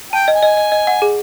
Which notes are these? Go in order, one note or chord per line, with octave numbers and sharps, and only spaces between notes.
G5 A5
D#5
G#5
D#5
D#5
D#5
F#5
G#4